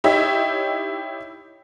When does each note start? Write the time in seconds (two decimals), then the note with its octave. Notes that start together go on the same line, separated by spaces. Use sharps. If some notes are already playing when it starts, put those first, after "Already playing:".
0.04 D#4 E4 G4 C#5 D#5 E5